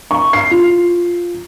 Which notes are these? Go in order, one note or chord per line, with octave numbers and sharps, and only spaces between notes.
C#6
C7
F4